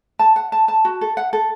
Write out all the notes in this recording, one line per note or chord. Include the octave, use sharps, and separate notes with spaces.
A5
F#5
A5
A5
F#4
A4
F#5
A4